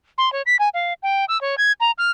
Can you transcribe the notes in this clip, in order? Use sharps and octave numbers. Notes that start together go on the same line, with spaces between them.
C6
C#5
B6
G#5
F5
G5
E6
C#5
G#6
A#5
F6